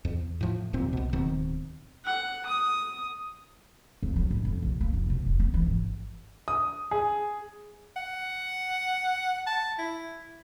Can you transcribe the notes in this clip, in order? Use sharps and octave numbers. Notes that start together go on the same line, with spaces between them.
E2
A2 F3
F#1 D#2 A#2 C4
C2 B2
D1 B2 D#3 C4
F#5
D#6
F2
F#3
A1
F2
A#1
A#3
F1
B2
F1
B3
E3
G#1
D#6
G#4
F#5
A5
E4